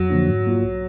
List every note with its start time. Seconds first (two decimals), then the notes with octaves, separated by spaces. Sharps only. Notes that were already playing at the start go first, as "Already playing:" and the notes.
Already playing: F2 F#3
0.10 D3 F3 A#3 D4
0.28 G#2
0.45 F#3 A#3 F4
0.63 B1